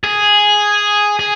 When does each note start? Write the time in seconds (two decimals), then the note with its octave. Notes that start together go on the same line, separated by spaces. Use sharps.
0.04 G#4
1.19 G#4